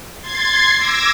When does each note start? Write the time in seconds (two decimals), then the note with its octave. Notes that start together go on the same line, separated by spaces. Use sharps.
0.21 C6 G#6 A6 C7
0.76 D6 E6 G#6 A#6